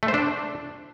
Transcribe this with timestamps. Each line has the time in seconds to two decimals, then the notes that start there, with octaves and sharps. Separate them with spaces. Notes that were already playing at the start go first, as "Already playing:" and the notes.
0.03 A3
0.08 C5
0.14 D4